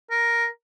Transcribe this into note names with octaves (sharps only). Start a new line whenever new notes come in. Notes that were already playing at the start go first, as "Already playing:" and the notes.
A#4